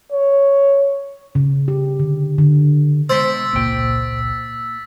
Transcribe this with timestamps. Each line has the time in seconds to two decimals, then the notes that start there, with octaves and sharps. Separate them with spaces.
0.12 C#5
1.35 C#3
1.68 G4
1.99 D3
2.38 D3
3.09 B2 G#3 C5 C6 E6 A6 B6
3.53 G#1 C#2 A#2 A#3 G5